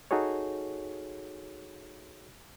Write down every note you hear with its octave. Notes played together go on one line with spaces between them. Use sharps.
D#4 F#4 G#4 A4 C#5